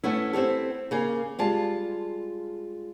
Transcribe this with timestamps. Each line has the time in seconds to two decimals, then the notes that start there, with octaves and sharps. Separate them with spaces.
0.04 A3 B3 C#4 E4
0.33 C4 E4 G4 A4
0.91 C#3 A#3 G#5
1.39 G3 G#3 F4 A5